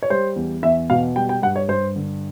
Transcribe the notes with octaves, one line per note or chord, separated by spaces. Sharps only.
C#5
G3 C5
E2
E2 E5
B2 F5
G3 G5
G5
G2 F#5
C#5
G2 C5
D3